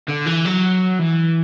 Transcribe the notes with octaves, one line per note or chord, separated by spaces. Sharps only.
D3
E3
F#3
E3